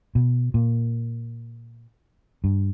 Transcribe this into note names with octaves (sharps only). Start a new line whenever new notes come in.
B2
A#2
G2